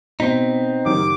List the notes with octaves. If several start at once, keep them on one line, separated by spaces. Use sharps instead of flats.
B2 C4 D#4 B6
F#1 F#2 D#3 G4 D6